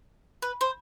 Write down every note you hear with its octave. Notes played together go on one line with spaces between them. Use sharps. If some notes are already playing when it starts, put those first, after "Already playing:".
B4
C5